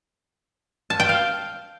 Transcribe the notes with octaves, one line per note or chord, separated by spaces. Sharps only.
A5
G5
F5